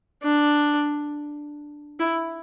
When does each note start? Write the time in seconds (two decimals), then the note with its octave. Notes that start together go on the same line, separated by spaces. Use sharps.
0.23 D4
2.00 E4